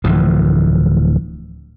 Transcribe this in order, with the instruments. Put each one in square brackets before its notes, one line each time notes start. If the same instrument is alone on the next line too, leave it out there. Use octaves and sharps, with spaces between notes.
[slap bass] D1 D2 E3 F3